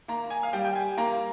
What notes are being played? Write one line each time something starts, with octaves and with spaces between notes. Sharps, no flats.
A#3 A#5
G#5
F5
G3 G5
G5
G#5
A#3 A#5